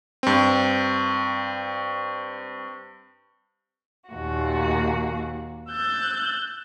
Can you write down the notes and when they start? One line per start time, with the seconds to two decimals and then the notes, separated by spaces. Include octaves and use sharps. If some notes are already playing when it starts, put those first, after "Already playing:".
0.23 G2 C4
4.11 D#2 A#2 F#4
5.69 E6 F#6 G6 A6